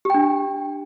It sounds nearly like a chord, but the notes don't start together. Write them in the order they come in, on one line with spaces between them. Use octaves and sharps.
G4 G5 D4